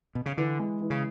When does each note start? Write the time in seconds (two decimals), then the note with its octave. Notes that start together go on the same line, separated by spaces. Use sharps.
0.15 B2
0.26 C#3
0.37 D3 E3
0.59 G#3
0.81 E3
0.90 C#3